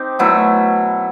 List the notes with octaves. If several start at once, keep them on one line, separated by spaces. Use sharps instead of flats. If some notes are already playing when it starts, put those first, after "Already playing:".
Already playing: C4 D#4 G4
B2 F#3 A3 E4